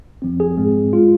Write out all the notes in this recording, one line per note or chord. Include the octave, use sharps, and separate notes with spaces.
F2 F3 C4
G#4
G#2 G#3 C4
G#3 F4